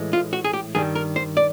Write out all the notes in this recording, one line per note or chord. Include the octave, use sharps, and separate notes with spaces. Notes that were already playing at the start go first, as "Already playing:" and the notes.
Already playing: A2 E3 G#3
F4
F#4
G#4
G4
G2 D#3 G3 G#4
A#4
C5
D5